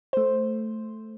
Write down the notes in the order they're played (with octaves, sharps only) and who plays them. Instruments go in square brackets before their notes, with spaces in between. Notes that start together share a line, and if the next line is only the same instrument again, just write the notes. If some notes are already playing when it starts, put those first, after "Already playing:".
[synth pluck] A3 C5